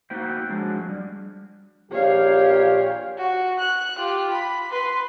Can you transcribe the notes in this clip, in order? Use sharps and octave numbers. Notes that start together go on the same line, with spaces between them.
A#3 D#4 F#4 B4 C5 G5
F3 F#3 G#3 D4
G3
A#1 A#2 G4 C#5 F5
F#4
F#6
F4 G4
B5
B4 C6